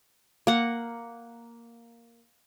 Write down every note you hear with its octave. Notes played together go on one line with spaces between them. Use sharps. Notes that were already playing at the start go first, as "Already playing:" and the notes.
A#3 F#5